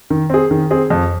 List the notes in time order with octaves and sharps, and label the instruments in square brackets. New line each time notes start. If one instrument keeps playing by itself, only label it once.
[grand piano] D#3
C4 G#4
D#3
C4 G#4
F2